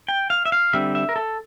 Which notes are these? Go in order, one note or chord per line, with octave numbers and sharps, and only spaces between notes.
G5
F5
E5
F5
D3 G3 C4 E5
E5
A#4
A4